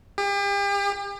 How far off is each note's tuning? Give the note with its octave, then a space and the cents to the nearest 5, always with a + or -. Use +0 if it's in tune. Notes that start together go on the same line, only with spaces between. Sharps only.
G4 +40